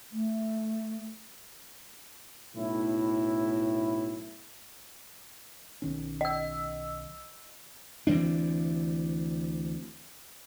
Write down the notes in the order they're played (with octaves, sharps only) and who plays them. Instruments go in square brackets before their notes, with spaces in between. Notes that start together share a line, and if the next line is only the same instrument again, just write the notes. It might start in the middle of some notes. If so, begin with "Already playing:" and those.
[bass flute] A3
[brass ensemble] B1 A2 E4
[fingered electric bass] B1 D#3 C#4
[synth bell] D#5 E6
[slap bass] D2 E3 C4 D4